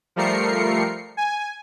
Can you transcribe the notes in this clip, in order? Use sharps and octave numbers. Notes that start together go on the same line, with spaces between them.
F3 G3 A3 A#4 C7 C#7
G#5